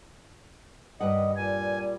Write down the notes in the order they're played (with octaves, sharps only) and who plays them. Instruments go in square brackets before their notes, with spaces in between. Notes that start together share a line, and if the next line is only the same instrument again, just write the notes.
[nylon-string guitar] G2 B4 F#5 [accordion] D#3 G3 D#5
[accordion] A#2 G3 [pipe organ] G#5